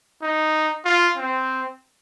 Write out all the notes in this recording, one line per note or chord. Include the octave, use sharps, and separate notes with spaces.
D#4
F4
C4